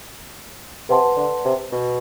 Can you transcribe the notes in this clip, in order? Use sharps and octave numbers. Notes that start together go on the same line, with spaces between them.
C3 B4 F#5 A5 C6
D3
C3
B2